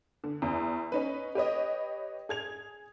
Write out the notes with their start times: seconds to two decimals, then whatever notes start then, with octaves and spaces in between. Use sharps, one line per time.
0.24 D3
0.42 E2
0.92 C#4 D#4 B4
1.35 G4 B4 C#5 D#5
2.29 G#4 G#6 F7